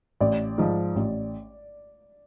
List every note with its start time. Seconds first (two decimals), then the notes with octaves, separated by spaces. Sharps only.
0.21 A1 D5
0.58 G#2 F3
0.96 A1